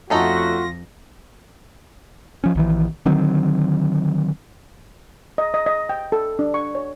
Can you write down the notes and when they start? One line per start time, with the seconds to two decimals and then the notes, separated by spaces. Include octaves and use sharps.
0.10 F2 A3 C#4 D#4 F4 F#4 A4 A#6
2.44 F3 C#4
2.55 A#1 D#3 E3
3.06 D3 D#3 F#3 C4
5.38 D#5
5.54 D#5
5.66 D#5
5.89 G5
6.12 A4
6.39 D4
6.54 C#6
6.75 C#5